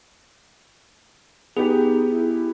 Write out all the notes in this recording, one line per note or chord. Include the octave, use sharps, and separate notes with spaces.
B3 D#4 G4 G#4
E4